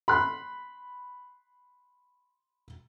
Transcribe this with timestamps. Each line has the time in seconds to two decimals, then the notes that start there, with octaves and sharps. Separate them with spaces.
0.08 B5 C6 F#6